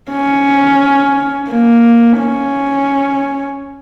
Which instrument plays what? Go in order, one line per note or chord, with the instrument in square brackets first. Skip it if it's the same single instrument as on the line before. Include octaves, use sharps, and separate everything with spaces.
[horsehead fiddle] C#4
A#3
C#4